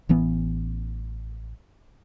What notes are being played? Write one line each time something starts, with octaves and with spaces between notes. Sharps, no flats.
A1 E3 B3